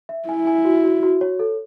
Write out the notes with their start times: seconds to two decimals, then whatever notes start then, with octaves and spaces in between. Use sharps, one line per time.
0.09 E5
0.28 E4 G#5
0.47 G#5
0.65 F#4
0.83 F#4
1.03 F#4
1.21 C#5
1.39 A4